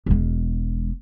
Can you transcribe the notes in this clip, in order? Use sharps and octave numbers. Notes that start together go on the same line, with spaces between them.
E1 G#3